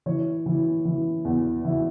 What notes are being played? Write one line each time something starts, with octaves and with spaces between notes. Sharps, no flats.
E3 C#5
E3
E3
E2
E3 E4